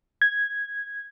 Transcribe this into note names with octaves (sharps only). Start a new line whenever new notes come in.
G#6